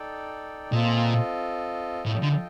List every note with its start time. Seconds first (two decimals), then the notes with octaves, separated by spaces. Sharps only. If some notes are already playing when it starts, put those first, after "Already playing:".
Already playing: D#4 A4 D5 G5
0.72 A#2 C4 F4 A4 D#5
2.06 A2 F4 A4 D#5 G5
2.23 D3